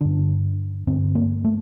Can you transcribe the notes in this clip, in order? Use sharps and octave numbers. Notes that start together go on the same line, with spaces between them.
G2 D3 D4
G2 D3 C4
A#3
A3